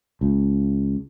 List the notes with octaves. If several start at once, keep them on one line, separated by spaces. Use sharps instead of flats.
C#2